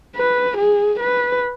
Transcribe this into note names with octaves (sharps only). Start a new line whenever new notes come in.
B4
G#4
B4